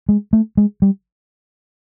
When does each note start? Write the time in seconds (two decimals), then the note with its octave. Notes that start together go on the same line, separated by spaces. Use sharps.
0.09 G#3
0.33 A3
0.57 G#3
0.82 G3